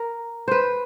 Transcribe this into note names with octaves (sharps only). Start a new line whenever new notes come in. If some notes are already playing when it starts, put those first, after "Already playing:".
Already playing: A#4
B4 C5